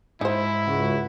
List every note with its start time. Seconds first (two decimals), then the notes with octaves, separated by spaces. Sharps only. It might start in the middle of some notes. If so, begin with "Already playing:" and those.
0.21 G#2 D#4 E4 C5
0.67 C#2 F#4